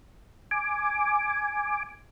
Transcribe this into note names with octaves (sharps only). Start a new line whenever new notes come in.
G#5 D6